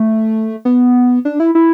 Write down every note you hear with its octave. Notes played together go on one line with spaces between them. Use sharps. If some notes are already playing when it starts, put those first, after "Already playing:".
Already playing: A3
B3
D4
E4
E4